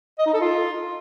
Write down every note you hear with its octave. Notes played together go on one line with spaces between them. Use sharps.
D#5
D#4
A4
F4